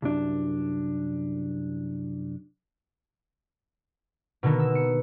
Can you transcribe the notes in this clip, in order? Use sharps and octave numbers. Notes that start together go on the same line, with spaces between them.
C2 F#2 D4
B2 D3 D#3 A#3 B3
E6
C#7